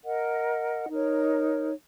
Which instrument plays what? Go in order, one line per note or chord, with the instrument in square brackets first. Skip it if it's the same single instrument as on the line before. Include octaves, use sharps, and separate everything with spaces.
[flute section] A#4 D#5 F#5
D#4 A#4 C#5